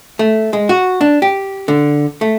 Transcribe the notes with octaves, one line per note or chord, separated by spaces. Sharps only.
A3
G#3
F#4
D4
G4
D3
A3